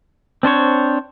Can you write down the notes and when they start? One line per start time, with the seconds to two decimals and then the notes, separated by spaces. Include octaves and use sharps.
0.43 C4 D4 C5 C#5